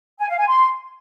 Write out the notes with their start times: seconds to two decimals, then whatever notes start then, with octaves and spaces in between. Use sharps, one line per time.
0.19 G#5
0.29 F5
0.38 G#5
0.48 C6